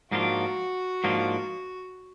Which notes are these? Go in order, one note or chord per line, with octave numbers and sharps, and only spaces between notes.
G#2 F3 A#3 D4 F4 F#4
G#2 F3 A#3 D4 F4